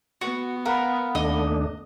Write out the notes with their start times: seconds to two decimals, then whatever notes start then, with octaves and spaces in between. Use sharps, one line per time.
0.21 B3 F#4
0.66 A#4 F5 F#5 B5
1.15 D#2 A3 D4 D#5